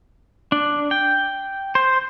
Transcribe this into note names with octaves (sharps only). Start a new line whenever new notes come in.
D4
G5
C5